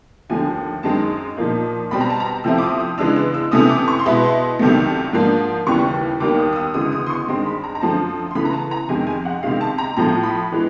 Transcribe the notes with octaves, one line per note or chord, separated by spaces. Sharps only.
D#2 D3 F3 A3 G#5
F#2 D#3 G#3 C4 D#4 A5
A#2 F3 A#3 D#4
B2 G3 C4 B5
A#5
A5
A#5
C3 F3 A3 C4 E4 E6
D6
D#6
D#6
C#3 E3 G#3 B3 D4 E6
E6
E6
C3 E3 A3 C#4 D#6
D6
C#6
C6
B2 G#3 B3 E4 B5
C6
C2 C3 D#3 F#3 A3
G#2 F3 A#3 D4
D#2 C#3 E3 G3 C#6
D#2 D#3 G3 A#3 D6
D#6
D#6
E6
D2 C#3 E3 G#3 D#6
D#6
C6
C#6
G2 D#3 G#3 C4 C6
B5
A#5
A#5
F#2 D3 F3 A3 C4 A5
C6
C#3 E3 A3 B5
A#5
A5
A#5
F2 C3 D#3 G#3 G#5
G#5
F#5
C3 D#3 G#3 F5
A5
A#5
A2 F3 A3 A#5
B5
E3 G#3